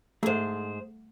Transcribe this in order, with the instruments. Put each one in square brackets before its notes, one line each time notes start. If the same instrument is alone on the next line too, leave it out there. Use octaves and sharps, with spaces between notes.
[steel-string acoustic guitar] D#2 G#2 [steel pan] A3 [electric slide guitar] G#4 C5